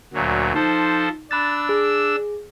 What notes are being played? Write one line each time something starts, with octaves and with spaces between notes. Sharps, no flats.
D2 A#2 F#3
F3 D#4 A4 C5
D4 B5 E6 F#6 A6
G#4